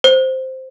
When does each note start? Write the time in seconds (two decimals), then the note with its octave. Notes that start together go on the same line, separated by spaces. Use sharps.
0.04 C5